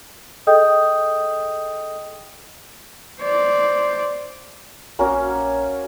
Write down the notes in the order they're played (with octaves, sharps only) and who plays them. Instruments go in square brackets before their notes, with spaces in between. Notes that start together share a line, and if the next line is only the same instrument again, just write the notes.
[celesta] G#4 A4 D#5 G5 D#6 G6
[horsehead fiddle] C5 D5
[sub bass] A#1 [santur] A#3 C#4 F#4